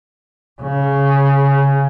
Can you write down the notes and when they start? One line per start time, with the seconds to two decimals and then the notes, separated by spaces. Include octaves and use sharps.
0.61 C#3